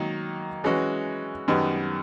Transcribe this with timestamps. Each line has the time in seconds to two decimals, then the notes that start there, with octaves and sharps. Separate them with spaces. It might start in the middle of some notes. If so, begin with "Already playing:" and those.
Already playing: D#3 F#3 A#3
0.64 E3 G#3 C#4 F#4
1.48 F#2 D#3 G3 B3